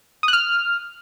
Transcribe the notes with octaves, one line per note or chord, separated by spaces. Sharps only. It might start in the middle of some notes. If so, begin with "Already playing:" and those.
D#6
F#6
F6